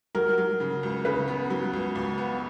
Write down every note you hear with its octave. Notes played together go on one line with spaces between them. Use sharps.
F#3 A#4
F#3
C#3
C#2
C#3 B4
B3
F#3
C#2
C#2
B3